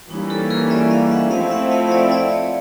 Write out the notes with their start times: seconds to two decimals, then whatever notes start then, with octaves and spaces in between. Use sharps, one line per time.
0.10 E3 G3 A#3 C#4 D#4
0.30 G4 A4
0.50 G#4 A#4
0.70 D5 E5
0.91 D#5 F5
1.11 E5 F#5
1.31 F3 A3 C4 E4 A4 D#5 F5
1.51 E5 F#5
1.71 D#5 F5
1.87 F5
1.91 D5 E5
2.11 D5 E5
2.32 C#5 D#5